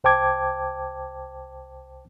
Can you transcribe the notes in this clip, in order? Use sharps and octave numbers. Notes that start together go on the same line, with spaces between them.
C2 C5 G5 A5 D6 G#6